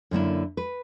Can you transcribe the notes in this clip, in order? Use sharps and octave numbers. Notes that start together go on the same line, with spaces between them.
F#2 D3 A#3 E4
B4